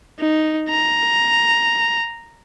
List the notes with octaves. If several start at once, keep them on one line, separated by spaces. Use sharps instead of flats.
D#4
A#5